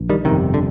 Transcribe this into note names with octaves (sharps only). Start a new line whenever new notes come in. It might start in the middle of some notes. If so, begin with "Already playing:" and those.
Already playing: A#1
D#3 G3
G1 F2 C3 D#3
D3